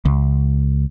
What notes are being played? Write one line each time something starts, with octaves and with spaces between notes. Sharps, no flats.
C#2